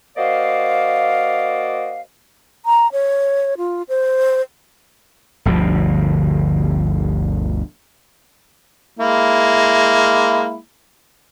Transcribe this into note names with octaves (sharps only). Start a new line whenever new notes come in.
A#3 F#4 C5 D5 D#5 F5
A#5
C#5
F4
C5
G1 D2 B2 F3
G#3 A#3 E4